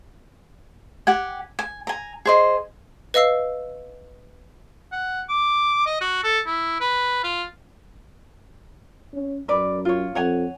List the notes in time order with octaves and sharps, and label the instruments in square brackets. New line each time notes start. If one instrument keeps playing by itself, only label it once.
[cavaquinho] G4 F#5 G#5
G#5
G#5 A#5
G#4 C5 D#5
[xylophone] B4 D#5 F5 E6 C7
[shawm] F#5
D6
D#5
F#4
A4
E4
B4
F4
[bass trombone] C#4
[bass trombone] F#2 [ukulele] A#4 B4 D5
[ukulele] F4 C#5
[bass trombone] F2 [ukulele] C#5 F#5 G#5